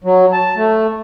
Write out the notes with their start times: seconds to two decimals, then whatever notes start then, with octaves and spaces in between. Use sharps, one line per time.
0.04 F#3
0.33 A5
0.56 A3